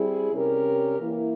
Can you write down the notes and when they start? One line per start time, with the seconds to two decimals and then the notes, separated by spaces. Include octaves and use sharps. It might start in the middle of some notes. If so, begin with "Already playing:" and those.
Already playing: G3 C4 E4 G#4
0.32 C3 G3 C#4 G4 A#4
0.99 E3 A#3 E4